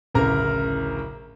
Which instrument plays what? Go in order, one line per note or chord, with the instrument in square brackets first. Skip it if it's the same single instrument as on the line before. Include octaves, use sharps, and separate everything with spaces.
[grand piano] D1 A1 C#3 A#4 A#5